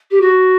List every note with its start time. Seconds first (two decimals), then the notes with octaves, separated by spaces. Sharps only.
0.11 G4
0.21 F#4